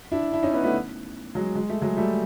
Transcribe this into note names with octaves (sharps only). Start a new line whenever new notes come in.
D4 E4
D4 E4
C#4 D#4
B3 C#4
A3 B3
F#3 G#3
G#3
A3
F#3 G#3
G3 A3